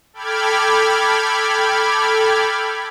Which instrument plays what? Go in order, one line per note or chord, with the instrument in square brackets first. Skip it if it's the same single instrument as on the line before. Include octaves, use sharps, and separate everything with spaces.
[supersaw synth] A4 G5 B5 D6 F6 G#6